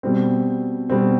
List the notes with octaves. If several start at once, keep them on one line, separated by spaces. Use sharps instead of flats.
B2 G3 C4
B2 G3 C4